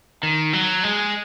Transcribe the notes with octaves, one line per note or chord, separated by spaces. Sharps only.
D#3
F#3
G#3